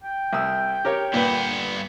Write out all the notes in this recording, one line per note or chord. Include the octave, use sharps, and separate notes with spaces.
G5
C2 D#6 E6
G4 A#4 C#5
G2 A#2 B3 B4